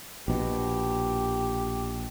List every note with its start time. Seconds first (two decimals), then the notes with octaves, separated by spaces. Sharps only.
0.28 A#1 B2 G4